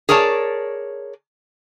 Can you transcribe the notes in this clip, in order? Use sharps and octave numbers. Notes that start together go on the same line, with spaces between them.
G#4 A#4 C#5 D5 A5